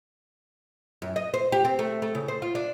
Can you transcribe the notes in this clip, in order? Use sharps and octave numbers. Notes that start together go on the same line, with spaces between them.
F#2
D#5
C5
G4
C4
A3
A3
C#3
C5
F4
D4